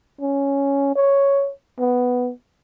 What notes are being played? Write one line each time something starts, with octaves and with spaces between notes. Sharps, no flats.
C#4
C#5
B3